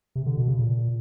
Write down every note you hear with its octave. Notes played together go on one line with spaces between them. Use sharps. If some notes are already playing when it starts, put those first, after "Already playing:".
C3
D3
B2
C#3
A#2